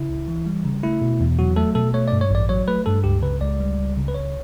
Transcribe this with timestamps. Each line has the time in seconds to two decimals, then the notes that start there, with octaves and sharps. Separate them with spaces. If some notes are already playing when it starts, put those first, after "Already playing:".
Already playing: C#3 E4
0.09 C#2
0.28 E3
0.46 G3
0.65 C#3
0.83 A3 E4
1.02 B2
1.20 E2
1.39 F#3 F#4
1.56 A3 A4
1.75 B2 A4
1.94 A3 C#5
2.08 D5
2.12 G2
2.21 C#5
2.31 A1 D5
2.49 F#3 C#5
2.68 A3 B4
2.86 G2 A4
3.04 C#2 G4
3.22 C#3 B4
3.41 C#2 D5
3.60 G3
3.78 C#2
3.97 C#3
4.08 B4
4.14 C#2 C#5